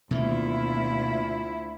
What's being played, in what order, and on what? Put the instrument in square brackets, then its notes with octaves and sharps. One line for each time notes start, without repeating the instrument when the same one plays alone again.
[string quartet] D2 E4 [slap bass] B2 D#3 A#3 [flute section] F4 E5